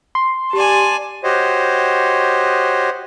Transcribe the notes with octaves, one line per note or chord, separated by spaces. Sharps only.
C6
G4 D5 G#5 A5
F#4 G4 C5 C#5 D#5